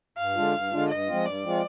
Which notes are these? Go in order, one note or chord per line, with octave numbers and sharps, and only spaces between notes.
G2 F5
D3 G#3 D4 F4
G2
D3 G#3 D4 F4
G2 D#5
F3 G#3 C4 F4
G2 D5
F3 G#3 C4 F4